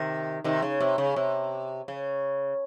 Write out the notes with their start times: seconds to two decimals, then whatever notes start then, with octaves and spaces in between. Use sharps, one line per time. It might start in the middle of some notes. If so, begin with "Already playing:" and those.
Already playing: C3 D#3
0.44 C3 D#3
0.62 C#3
0.80 C3
0.98 C#3
1.16 C3
1.88 C#3